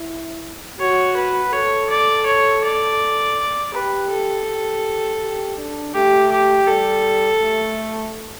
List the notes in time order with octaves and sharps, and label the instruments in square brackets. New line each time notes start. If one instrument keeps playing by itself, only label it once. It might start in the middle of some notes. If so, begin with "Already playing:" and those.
Already playing: [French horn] E4
[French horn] F#4 [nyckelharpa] C#5
[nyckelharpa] B4
[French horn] A4 [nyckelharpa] C#5
[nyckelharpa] D5
C#5
D5
[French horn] G4 [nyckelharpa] B4
[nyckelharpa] A4
[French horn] G4
G4
D4
[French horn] A3 [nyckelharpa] G4
[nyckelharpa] G4
[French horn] G3 [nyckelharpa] A4
[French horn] A3